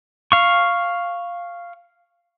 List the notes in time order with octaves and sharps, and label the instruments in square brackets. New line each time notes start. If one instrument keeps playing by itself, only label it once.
[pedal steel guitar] F5 C#6